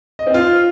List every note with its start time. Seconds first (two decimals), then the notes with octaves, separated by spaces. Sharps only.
0.19 D#5
0.27 C4
0.34 F4